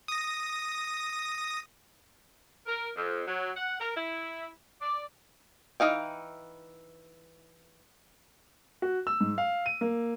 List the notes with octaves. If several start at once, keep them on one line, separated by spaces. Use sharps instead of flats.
D#6 A#6
A#4
F2
F#3
F#5
A#4
E4
D5
E3 D#4 F5 G5
F#4
E6
G#2
F5
D#7
A#3